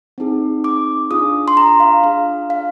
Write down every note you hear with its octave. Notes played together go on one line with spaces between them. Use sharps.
C4 D#4 G#4
D6
D4 F4 G#4 D#6
C6
A#5
F5
D4 F4 G#4 F5
F5